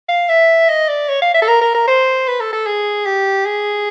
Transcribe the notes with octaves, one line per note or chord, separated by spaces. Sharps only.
F5
E5
D#5
D5
C#5
F5
E5
A4
A#4
A#4
A#4
C5
B4
A4
A4
G#4
G4
G#4